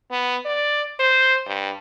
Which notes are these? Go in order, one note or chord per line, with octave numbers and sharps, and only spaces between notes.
B3
D5
C5
G2